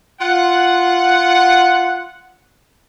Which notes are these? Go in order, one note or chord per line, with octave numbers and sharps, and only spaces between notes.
F4 F#5